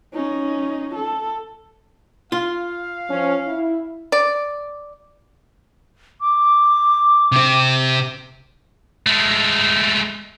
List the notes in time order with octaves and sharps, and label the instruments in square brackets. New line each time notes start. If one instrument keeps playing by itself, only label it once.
[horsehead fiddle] C#4 D#4
A4
[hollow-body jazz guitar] F4 [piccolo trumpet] F5
[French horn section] F3 C#4
E4
[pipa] D5
[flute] D6
[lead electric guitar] C3 C4
[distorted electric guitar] G#3 A3